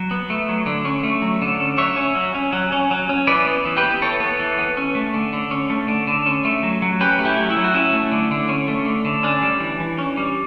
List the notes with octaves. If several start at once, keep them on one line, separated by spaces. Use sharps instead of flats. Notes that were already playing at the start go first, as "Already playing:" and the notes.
Already playing: F#3
B3
A3
F#3
D3
C#4
A3
F#3
D3
C#4
F#3 C#5 E5
C#4
F#3
C#4
F#3
C#4
F#3
C#4
E3 B4 D5
B3
E3
G4 B4
B3
E3 A4 C#5
B3
E3
B3
C#4
A3
D3
D3
C#4
A3
D3
D3
C#4
A3
F#3
F#3
C#4 G4 B4
A3
E4 G4
F#3
E4
F#3
F#4
C#4 E4
A3
D3
D3
C#4
A3
D3
D3
C#4 D4
G3
E3
E3
C#4
G3